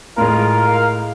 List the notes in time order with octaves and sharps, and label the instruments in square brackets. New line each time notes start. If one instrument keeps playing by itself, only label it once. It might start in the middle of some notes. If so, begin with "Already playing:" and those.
[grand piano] A2 G#3 [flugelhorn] F4 [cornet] A#4
[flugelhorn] F5